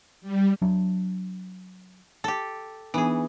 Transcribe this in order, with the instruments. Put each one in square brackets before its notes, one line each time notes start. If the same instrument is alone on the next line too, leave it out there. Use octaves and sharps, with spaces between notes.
[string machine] G3
[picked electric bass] F#3 D4
[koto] G4 A4
[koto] E3 G#4 [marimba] B3 D4 D#4